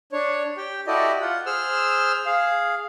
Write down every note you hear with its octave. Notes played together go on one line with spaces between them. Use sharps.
D4 C#5
G4 G5
E4 F#4 G4 A4 D5 D#5
F4 F#5
G#4 C5 E6 F6
G#4 F5